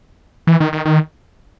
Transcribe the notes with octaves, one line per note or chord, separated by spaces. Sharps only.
E3
D#3
D#3
D#3